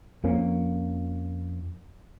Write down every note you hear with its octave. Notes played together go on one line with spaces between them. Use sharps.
F2 F3 A#3 C#4